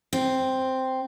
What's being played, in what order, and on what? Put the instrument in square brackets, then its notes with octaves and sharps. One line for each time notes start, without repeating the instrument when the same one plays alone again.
[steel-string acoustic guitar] C4